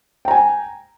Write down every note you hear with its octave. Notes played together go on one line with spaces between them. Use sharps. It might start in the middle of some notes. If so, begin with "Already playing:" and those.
G5 G#5 A#5